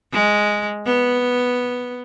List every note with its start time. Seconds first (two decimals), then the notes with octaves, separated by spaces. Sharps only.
0.12 G#3
0.86 B3